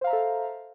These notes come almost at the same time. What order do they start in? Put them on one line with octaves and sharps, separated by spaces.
C5 F5 A#5 E5 A4